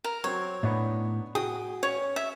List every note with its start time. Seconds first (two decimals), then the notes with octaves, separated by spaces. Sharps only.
0.04 A#4
0.24 F#3 C4 C#5
0.63 A2 B3 D4 D#4
1.35 F#4 G#4 G5 D#6
1.83 C#4 C#5
2.16 E5